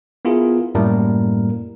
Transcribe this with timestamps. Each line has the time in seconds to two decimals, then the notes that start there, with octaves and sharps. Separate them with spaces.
0.25 B3 E4 F4 G#4 A#4
0.75 F#2 A2 G3 A#3 A#4